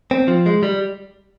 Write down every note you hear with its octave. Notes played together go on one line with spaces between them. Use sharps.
C4
F3
G#3
G3